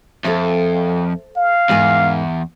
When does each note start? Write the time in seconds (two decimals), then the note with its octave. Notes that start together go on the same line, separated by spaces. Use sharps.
0.25 F2 A4 C5 E5
1.37 F5
1.69 E2 G#2 A#4 G#5